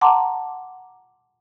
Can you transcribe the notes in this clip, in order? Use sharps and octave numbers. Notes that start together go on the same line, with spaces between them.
F#5 A5 A#5 C6 D6